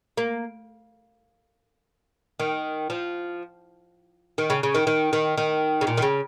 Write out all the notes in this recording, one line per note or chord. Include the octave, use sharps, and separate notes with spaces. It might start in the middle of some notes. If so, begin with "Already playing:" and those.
A#3
D#3
F3
D#3
C#3
C#3
D#3
D#3
D#3
D#3
C#3
A#2
D#3
C#3